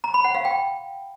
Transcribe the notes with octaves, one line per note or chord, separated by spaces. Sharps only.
A#5
B5
F#5
F5
G5